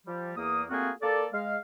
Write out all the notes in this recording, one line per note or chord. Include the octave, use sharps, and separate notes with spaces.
F3 G3
E2 A#3 D#6
A3 A#3 C4 F4 F#4 G#4
A#3 A4 D5
G#3 F5